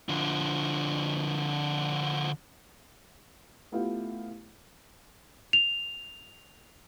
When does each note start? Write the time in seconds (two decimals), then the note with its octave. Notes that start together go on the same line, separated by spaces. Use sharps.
0.09 D3 F3
3.72 A3 B3 E4 F4 G4 F5
5.53 F7